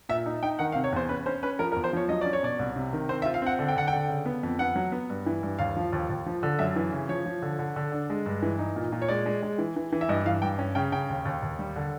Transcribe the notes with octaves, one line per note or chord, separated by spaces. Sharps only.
A#2 E5
D#4
D#4 G5
D#3 F#5
F5
C3
C#5
E2 C5
C#4 B4
C#4 C5
C#4 B4
F3 A#4
A#4
E2
C5
F3 C#5
F#3 D#5
C#4 D5
C#5
B2 D5
C2
C3
D#3
C4 C5
E5
F4
F5
C4 F#5
D3
G5
D3 F#5
G5
D3
C#3
B3
F2
B3 F#5
F#3
B3
G2
E3
G2
D#2 F5
F3
D#2
D#2
F3
D3
F#2 E5
E3
C#3
F3 C#5
F3
D3
D3
D3
D4
G#3
G2
E3
D#4
A#2
A#2
C#5
G#3 D5
G#3
G#3
E3
E3
E3
E5
G2 D#5
E3 F5
G2 G5
C#4
C#3 G5
C#3 G5
D#2
D#2
D#2
G3
D3